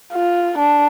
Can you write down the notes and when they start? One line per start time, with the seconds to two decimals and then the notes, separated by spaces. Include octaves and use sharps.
0.13 F4
0.58 D4